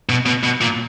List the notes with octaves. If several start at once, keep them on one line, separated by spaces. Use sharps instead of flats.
B2
B2
B2
A#2